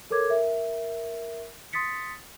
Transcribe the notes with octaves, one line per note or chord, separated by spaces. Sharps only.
A4 A#4 C#5 D6 G#6
A#4 E5
C6 D#6 A6 B6 C#7